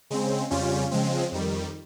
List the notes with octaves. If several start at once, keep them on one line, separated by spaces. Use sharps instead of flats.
C#3 G#3 C4
F2 C#3 G3 C#4 F4
C#3 F3 G#3 C4
F2 D#3 G3